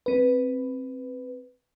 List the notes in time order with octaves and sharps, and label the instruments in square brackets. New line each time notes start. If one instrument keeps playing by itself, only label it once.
[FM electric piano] C4 B4